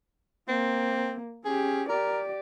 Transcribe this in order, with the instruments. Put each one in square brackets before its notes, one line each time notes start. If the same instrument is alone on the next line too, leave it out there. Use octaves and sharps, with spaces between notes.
[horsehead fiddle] A#3 [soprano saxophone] C4
[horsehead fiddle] C#4 G4 [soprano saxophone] G#4
[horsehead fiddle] G4 D5 [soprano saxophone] A#4